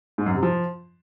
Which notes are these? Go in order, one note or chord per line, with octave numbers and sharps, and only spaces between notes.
G#2
F#2
C3
F3